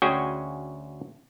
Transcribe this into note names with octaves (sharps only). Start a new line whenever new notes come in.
D2 C#4 F#4 G#4 G5 G#5